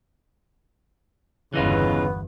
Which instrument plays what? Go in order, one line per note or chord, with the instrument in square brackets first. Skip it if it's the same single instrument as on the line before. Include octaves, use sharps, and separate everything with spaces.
[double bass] G1 E2 [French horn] C#3 [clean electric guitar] E3 D#4 F4 [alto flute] B3